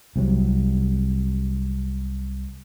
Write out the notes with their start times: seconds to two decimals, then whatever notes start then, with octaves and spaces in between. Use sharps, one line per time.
0.16 C2 C3 D#3 F#3